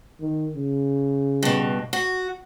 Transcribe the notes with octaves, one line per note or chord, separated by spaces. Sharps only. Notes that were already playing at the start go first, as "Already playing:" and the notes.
D#3
C#3
G2 B2
F#4